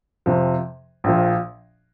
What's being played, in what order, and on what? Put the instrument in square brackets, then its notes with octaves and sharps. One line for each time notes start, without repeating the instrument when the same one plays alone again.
[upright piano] F2 C3 F3
A#1 A#2 F3